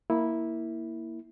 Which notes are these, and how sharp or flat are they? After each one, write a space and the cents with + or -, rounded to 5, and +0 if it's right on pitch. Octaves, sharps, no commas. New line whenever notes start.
A#3 +0 E4 -10